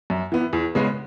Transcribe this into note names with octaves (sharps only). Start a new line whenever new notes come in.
F#2
E3 B3
E2
C#3 G#3 B3